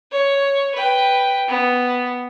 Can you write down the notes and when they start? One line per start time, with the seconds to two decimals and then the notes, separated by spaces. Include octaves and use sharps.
0.12 C#5
0.75 B4 G5
1.49 B3